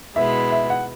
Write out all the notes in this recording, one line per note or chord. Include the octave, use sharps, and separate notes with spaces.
B2 G#3 B3 E4 E5
E5
F#5